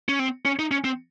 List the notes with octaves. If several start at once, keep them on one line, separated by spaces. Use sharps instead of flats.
C#4
C4
C#4
D#4
C#4
C4